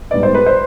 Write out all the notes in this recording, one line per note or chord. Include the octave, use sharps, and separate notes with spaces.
G#2 G3 B3 D5
C5
B4
C5